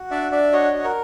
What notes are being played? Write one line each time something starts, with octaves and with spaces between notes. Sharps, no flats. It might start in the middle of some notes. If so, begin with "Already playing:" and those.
Already playing: F#4
D4 D5 E5
D4 D5 E5
F#4 C#5 D#5
F#4
A#4